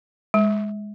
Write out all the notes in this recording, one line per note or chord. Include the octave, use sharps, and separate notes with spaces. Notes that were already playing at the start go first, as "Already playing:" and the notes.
G#3